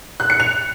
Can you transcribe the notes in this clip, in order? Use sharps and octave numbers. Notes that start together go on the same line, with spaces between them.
F#6
C#7
F7